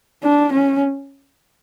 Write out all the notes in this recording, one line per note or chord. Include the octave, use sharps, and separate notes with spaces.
D4
C#4